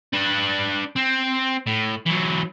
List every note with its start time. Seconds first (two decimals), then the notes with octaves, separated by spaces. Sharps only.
0.13 D4 B4
0.96 C4
1.67 A2
2.06 E3 F#3